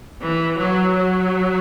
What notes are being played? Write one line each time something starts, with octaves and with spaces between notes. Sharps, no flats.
E3
F#3
F#3